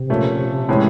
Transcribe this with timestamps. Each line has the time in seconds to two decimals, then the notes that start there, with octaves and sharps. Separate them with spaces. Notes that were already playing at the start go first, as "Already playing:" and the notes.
Already playing: C3
0.10 A#2 F3 A3 C#4
0.68 A2 E3 G#3 C#4